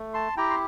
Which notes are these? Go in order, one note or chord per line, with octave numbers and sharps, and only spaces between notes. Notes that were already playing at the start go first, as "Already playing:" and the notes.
Already playing: A3
A5 C6
E4 G4 G5 A#5
C6